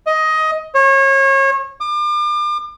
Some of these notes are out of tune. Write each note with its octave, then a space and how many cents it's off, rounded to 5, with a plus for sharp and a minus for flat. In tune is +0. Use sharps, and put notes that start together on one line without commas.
D#5 +15
C#5 -30
D6 +40